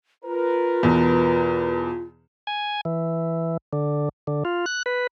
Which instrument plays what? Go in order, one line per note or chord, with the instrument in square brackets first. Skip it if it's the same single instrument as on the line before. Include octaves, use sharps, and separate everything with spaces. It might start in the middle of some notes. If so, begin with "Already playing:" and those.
[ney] F4 [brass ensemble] A#4 B4
[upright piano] E2 B2
[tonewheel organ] G#5
E3
D3
D3
F4
F#6
B4